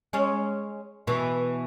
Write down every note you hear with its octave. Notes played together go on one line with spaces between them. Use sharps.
G#3 C#4
B2 E3